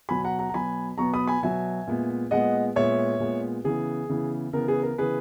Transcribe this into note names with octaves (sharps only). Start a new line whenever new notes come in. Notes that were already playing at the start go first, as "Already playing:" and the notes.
B2 F#3 B3 G#5 B5
F#5 A#5
F#5 A#5
A#5
B2 F#3 B3 G#5 B5
B2 F#3 B3 A#5 C#6
B5 D#6
G#5 B5
B2 F#3 B3 E5 G#5
A#2 G#3 B3
A#2 G#3 B3 D#5 F#5
A#2 G#3 B3 C#5 E5
A#2 G#3 B3
C#3 E3 B3 G#4
C#3 E3 B3
C#3 E3 B3 A#4
G#4 B4
A#4
C#3 E3 B3 G#4 B4